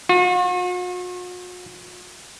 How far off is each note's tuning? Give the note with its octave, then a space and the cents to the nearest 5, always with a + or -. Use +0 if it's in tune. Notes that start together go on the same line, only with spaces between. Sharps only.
F#4 -45